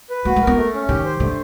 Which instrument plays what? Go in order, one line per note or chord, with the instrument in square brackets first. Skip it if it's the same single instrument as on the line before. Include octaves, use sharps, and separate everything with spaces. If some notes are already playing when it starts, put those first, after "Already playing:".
[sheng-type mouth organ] B4
[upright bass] A#3 [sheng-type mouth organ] F#4
[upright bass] A3
[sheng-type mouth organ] A#4
[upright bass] B3
[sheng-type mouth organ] A3
C#4
[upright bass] D#3 [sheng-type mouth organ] G4
[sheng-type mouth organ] C5
[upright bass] D3 [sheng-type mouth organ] A3